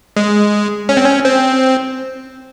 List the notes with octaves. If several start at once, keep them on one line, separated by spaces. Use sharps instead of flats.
G#3
C#4
C4
C#4
C4